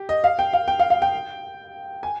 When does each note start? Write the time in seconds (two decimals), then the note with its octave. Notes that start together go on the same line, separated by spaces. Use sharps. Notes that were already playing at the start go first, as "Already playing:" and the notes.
Already playing: G4
0.09 D#5
0.24 F5
0.39 G5
0.53 F5
0.68 G5
0.79 F5
0.90 F5
1.02 G5
2.03 G#5